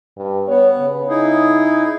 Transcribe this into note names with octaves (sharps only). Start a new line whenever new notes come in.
G2
B3 C#5
C#3
D#4 E4 G#4